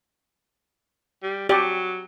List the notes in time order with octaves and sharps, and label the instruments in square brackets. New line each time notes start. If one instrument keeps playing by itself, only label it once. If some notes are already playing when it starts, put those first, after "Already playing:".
[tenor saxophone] G3
[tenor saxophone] F#3 [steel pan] G4 D5